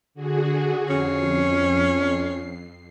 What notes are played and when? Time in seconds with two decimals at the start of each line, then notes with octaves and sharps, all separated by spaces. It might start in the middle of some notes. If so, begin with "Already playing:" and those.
0.14 D3 F#4 G#4
0.89 F2 C#4 C7